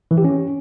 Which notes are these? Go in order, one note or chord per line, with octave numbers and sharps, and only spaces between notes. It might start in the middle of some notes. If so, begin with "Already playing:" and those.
E3
G4
C#4